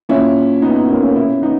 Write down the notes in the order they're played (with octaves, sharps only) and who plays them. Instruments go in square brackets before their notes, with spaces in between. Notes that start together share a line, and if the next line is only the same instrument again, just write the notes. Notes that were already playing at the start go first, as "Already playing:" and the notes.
[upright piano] A#2 C#4 E4
B3 D#4
B3 D#4
A#3 C#4
A#3 C#4
B2 C#4 E4
B3 D#4